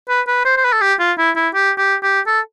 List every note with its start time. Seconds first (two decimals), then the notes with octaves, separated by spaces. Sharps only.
0.09 B4
0.27 B4
0.45 C5
0.57 C5
0.65 B4
0.73 A4
0.81 G4
0.99 F4
1.18 E4
1.36 E4
1.54 G4
1.78 G4
2.03 G4
2.27 A4